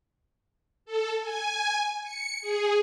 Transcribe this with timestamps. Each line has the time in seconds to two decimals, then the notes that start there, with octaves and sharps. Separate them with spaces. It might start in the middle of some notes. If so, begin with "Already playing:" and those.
0.85 A4
1.21 G#5
2.03 C#7
2.41 G#4